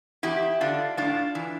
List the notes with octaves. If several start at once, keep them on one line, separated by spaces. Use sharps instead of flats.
E2 E4 G4
D3 D4 F4
A2 D4 F4
E3